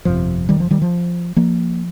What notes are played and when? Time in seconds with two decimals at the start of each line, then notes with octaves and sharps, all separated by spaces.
0.05 G1 F2 C3 F3
0.49 D#3 G3
0.60 F3
0.71 D#3 G3
0.82 F3
1.36 F3 A#3